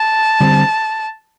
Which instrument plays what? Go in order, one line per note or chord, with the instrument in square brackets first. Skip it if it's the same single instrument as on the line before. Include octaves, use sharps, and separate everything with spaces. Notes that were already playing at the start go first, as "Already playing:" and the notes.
Already playing: [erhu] A5
[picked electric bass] D3 G3 C4